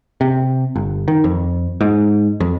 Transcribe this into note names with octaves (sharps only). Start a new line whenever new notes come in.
C3
G1
D#3
F2
G#2
F2